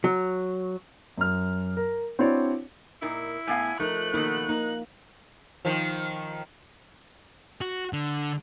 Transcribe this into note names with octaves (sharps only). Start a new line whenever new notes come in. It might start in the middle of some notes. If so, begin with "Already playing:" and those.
F#3
F#2 F6
A#4
C4 D4 E4 F#4 C#5 D5
A#2 D#4 E4 A#4
A2 B3 F5 G#5
F3 A3 D#4 A#4 F#6
B2 D#3 A#3 D#4 E4 A#4
A#3 D#4
D#3 F3
F#4
D3